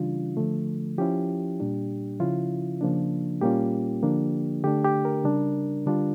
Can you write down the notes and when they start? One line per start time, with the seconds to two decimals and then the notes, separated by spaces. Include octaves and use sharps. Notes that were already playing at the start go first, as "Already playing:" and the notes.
Already playing: C#3 E3 G3 D4 F4
0.37 D3 F3 A3
0.98 F3 C#4 E4 G4
1.60 A#2 G3 D4
2.20 C#3 F3 C#4 E4 F4
2.81 C#3 F3 A#3 D4
3.41 A#2 G3 A#3 C#4 F4 G4
4.03 D3 F3 A#3 D4
4.64 D3 A3 D4 G4
4.85 G4
5.05 A#4
5.24 C#3 G3 D4
5.86 D3 G3 D4 F4